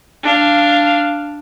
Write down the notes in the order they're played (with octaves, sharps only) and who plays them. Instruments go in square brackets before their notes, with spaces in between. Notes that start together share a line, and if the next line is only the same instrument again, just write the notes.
[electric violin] D4 F5